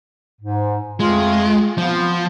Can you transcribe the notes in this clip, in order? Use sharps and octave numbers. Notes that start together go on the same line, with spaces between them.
G#2
F2 G#3 A3 F4
F3 B3 C4 F4